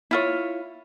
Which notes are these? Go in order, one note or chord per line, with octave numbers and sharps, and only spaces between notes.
E4 F4 C#5